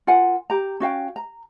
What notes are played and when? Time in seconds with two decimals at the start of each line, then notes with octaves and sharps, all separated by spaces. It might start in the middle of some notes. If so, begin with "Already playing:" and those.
0.07 F4 A#4 F#5 G#5
0.50 G4 A#5
0.80 C#4 F#4 F5 G5
1.16 A#5